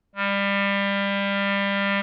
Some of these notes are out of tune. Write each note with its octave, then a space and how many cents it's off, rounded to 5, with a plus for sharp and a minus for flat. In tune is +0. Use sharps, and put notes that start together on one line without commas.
G3 +25